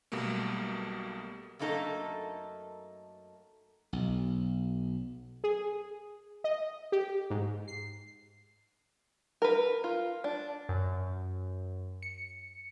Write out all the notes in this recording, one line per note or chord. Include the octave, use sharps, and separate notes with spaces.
B1 B2 G3 A3 A#3
F#2 A3 A#3 D#4 A4
B1
G#4
D#5
G4
G#2
C7
A#4 B4
F4
D4
F#2
C#7